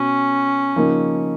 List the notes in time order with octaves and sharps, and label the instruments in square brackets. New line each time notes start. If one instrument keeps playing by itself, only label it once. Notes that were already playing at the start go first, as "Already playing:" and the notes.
Already playing: [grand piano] B2 [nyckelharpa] C#4
[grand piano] C#3 F3 A#3 D#4